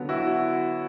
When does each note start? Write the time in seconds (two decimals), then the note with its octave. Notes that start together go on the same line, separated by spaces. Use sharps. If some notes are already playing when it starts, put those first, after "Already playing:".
Already playing: D3 F#3 B3
0.09 E4 F#4